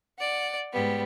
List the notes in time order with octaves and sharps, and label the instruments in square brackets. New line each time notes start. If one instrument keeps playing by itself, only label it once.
[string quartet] D5 F#5
G#2 G3 B3